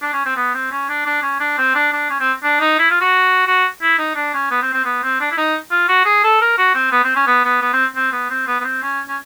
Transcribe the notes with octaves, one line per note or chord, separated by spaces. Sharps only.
D4
C#4
C4
B3
C4
C#4
D4
D4
C#4
D4
C4
D4
D4
C#4
C4
D4
D#4
E4
F4
F#4
F#4
E4
D#4
D4
C#4
B3
C4
C4
B3
C4
D4
E4
D#4
F4
F#4
G#4
A4
A#4
F#4
C4
B3
C4
C#4
B3
B3
B3
C4
C4
B3
C4
B3
B3
C4
C#4
C#4